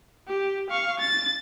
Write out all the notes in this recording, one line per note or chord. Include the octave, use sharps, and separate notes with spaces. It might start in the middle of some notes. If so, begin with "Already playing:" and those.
G4
F5 C#6
A6